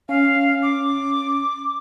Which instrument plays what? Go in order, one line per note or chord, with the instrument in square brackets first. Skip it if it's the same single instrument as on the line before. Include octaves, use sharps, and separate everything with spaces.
[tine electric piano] C#4 [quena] F5
[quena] D6